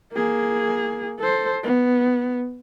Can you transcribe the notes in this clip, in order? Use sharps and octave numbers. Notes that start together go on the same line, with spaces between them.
A#3 G#4
A4 C5
B3